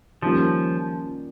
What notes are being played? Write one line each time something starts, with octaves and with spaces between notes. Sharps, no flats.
D#3 F3 G3 A#3 C#4 F4